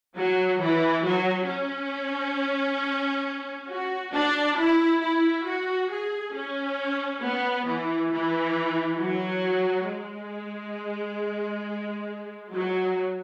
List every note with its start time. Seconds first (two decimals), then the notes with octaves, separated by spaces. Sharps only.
0.16 F#3
0.60 E3
1.05 F#3
1.48 C#4
3.69 F#4
4.13 D4
4.58 E4
5.02 E4
5.46 F#4
5.90 G#4
6.35 C#4
7.23 B3
7.67 E3
8.12 E3
9.00 F#3
9.88 G#3
12.54 F#3